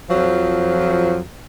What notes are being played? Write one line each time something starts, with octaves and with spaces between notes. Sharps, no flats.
F2 F3 F#3